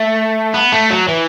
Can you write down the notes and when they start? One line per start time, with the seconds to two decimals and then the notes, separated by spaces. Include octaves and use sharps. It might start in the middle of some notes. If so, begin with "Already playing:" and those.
Already playing: A3
0.54 B3
0.72 A3
0.90 F#3
1.08 E3